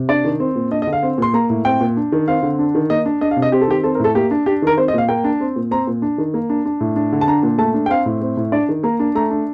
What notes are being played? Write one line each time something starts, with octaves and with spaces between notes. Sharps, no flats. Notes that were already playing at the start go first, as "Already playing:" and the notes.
Already playing: C3
D4 D5
D#3
C4
A#2
D4 D#5
D#5
D3
F5
C4
A#2 C6
A#3 A#5
A2
C4 G5
A#2
D4
D#3
C4 F5
D3
D4
D#3
A#3 D#5
D4
D4 D#5
F5
C3
D#5
C4 G4
A4
D#3 G4
C4 A4
A#4
A2 A4
A#3 G4
D4
D4 G4
D#3 A#4
C4 C5
D#5
A#2 F5
A#3 G5
D4
C4
A#2
C4 A#5
A#2
D4
D#3
A#3
D4
D4
A2
D4
D3
A5
D4 A#5
A#2
A3 A5
D4
G5
C4 F5
A2
C4
A2
D4 D5
D#3
A#3 A#5
D4
A3 A#5
D4